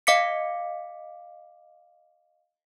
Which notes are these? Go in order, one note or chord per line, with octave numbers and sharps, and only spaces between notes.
D#5 F5 D6 B6 C#7